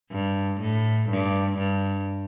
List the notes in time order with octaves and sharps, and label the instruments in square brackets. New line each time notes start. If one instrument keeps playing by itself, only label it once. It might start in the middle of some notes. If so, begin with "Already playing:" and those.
[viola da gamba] G2
A2
G2
G2